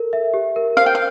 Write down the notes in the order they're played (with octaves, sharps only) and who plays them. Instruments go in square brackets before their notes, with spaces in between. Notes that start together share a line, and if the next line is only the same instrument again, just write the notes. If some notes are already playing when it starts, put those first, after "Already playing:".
Already playing: [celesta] A4 A#4
E5
G4
A#4
[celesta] C5 [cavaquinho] F5
[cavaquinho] G5
F5